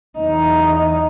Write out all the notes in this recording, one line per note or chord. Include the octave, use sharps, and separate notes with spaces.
E2 D#4